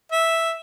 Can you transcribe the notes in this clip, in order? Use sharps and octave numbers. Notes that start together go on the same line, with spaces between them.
E5